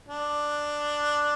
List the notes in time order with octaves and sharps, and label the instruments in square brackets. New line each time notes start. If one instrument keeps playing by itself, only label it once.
[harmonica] D4